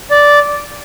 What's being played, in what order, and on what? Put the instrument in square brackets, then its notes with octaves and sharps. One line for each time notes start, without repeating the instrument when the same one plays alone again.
[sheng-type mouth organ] D5